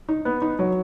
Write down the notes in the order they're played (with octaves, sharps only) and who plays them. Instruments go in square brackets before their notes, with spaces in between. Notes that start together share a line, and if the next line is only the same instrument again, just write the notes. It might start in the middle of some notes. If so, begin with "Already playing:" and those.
[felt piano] D#4
B3
D#4
F#3